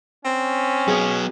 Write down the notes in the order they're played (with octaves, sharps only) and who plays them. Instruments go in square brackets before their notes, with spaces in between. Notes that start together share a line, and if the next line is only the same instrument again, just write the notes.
[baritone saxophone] C4 [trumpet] C#4
[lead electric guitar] F#3 B3 [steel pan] G#4